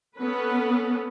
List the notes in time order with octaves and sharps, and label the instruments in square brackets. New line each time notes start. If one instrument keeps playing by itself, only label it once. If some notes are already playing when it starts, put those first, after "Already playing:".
[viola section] B3 C#4 A4 B4